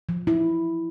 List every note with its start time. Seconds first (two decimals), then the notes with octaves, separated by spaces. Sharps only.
0.09 F3
0.27 E4